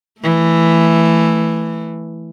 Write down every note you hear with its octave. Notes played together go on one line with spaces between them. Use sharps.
E3 A3